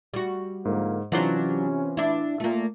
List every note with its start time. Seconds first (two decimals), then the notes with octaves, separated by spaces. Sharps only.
0.14 G3 F#4
0.65 G#2 D3 F3 A#3
1.12 C3 E3 F#3 C#4 D4 F4 C5
1.97 D4 E4
2.40 A#2 A3 A#3